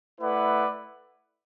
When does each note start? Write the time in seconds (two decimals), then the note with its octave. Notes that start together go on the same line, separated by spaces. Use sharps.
0.19 A3 E4 B4 D5 F#5